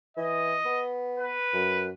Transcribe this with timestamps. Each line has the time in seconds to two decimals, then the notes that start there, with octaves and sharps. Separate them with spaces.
0.17 E3 D#5
0.65 B3
1.19 B4
1.53 F#2